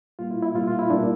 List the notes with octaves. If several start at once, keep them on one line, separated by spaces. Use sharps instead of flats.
A#2 G3 A#3 F4
E4
E4
A#2 G3 A#3 F4
F4
E4
A#2 G3 A#3 D4